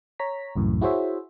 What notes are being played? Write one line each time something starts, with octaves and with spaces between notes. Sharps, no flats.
C#5 A#5 B6
C2 F#2 A2 E3
E4 F#4 G#4 C5 C#5 E5